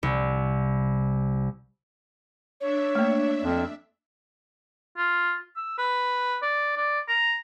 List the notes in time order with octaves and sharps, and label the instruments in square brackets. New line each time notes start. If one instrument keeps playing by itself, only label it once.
[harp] C2
[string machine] D4 E5 [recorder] C#5
[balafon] A3 A#3
[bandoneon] F2
[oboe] F4
E6
B4
D5
D5
A#5